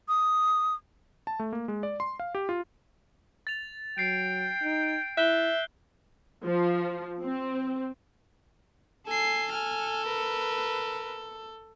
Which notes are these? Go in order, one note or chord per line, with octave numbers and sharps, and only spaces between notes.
D#6
A5
A3
A#3
G#3
D5
C6
F5
G4
F4
A6 F7
F#3 G5 A6 C7 D7
D#4
E4 E5 F#6 G6 G7
F3
C4
A4 G#5 C7
G#5 F6
A#4 B4